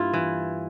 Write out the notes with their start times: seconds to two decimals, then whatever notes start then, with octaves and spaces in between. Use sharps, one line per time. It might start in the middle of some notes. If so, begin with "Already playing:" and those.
Already playing: G2 A#3 E4 F4
0.14 E3